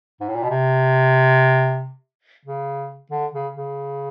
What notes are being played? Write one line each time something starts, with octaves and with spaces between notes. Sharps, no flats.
G#2
A2
A#2
B2
C3
C#3
D3
C#3
C#3